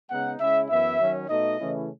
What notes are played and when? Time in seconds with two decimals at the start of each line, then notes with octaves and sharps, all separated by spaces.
0.11 C#3 G#3 B3 D#4 F#5
0.39 C#3 G#3 C#4 E4 E5
0.69 F#2 E3 B3 E4 E5
1.00 D#3 F#3 C#4
1.28 B2 A3 D#4 D#5
1.59 C#3 E3 A3 C#4 E4